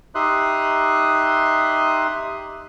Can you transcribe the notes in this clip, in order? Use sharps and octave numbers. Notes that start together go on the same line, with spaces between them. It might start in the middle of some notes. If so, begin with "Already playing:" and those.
D#4 G4 E5 C6 D#6 F#6